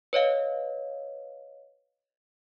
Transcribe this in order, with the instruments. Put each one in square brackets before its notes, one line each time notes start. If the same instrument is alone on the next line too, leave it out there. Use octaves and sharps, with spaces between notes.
[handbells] B4 C#5 D#5 F5